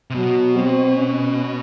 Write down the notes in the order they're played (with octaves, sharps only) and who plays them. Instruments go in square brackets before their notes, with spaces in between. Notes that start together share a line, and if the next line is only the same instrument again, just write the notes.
[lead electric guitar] C3
[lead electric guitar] B2 [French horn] F#3
[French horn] C4
C#4